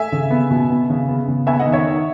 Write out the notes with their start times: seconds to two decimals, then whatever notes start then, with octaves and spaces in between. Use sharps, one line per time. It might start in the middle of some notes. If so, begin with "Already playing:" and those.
Already playing: A3 E5 G#5
0.12 C#3
0.30 B3
0.50 B2
0.70 B3
0.90 C#3
1.08 B3
1.28 C#3
1.46 B3 E5 G#5
1.59 D#5 F#5
1.66 D#3
1.72 C#5 E5
1.85 D#3